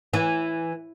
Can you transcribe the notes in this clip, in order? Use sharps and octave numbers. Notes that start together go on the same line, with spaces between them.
E3